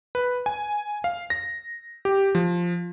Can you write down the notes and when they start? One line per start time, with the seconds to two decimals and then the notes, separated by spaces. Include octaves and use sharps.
0.15 B4
0.46 G#5
1.04 F5
1.30 A#6
2.05 G4
2.35 F3